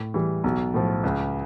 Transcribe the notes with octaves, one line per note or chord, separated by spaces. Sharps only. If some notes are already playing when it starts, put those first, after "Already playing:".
Already playing: A2
E3 G3
B1
A2 F3
C#2